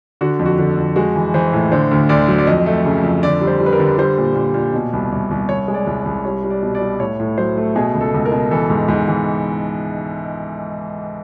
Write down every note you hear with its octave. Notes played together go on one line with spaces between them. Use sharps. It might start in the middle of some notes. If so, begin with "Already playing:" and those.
D3 F#4
F2
F#4
D3
F2
G#3 F#4
E3
E3 C5
A2
D3 C5
D2
D2 D5
F#3
D5
F2 D#5
A3
C#3
F2
D3 D5
G3
C5
G3
B4
A#4
D3
G3 C5
A#2
A#2
A#2
B2
C2
C2
C2
C2 C#5
G#3
D5
C2
D5
C2
G3 C#5
G3
D5
B2
D5
G3
A2 C#5
A2
F#3 C5
A3
B2 G#4
C#2
A4
C#2
A#4
B2
E3 A4
G#2
G#2
E3